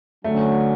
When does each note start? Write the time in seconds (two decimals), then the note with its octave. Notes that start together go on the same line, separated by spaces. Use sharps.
0.24 D3 F#3 A3 C#4